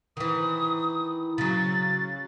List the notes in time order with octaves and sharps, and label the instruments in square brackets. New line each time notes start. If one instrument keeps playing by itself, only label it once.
[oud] D#3 E3 [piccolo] D#6
[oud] C#3 F#3 [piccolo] A6